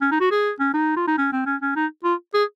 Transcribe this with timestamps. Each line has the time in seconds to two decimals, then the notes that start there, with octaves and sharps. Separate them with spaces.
0.01 C#4
0.12 D#4
0.20 F#4
0.31 G#4
0.60 C#4
0.74 D#4
0.96 F4
1.07 D#4
1.18 C#4
1.32 C4
1.46 C#4
1.62 C#4
1.76 D#4
2.04 F4
2.34 G#4